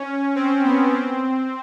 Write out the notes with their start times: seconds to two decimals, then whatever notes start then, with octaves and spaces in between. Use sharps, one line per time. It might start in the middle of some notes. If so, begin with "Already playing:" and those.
Already playing: C#4
0.36 C4
0.65 B3
0.93 C4